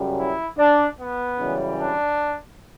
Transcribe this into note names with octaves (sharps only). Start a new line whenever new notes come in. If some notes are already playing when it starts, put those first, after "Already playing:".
Already playing: F#2 C#3 G3
E4
D4
B3
F#2 C#3 E3 G3
D4